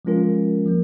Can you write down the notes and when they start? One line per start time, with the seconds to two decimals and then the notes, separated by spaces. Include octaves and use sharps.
0.05 F3 G#3 C#4 F4 A#4
0.66 F3 A#3